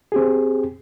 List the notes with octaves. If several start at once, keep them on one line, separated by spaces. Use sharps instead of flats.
C4 G4 G#4